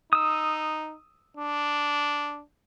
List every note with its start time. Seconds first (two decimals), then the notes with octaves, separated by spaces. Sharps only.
0.13 D#4 D#6 E6
1.37 D4